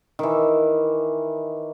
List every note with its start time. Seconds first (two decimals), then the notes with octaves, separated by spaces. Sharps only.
0.19 D#3 E3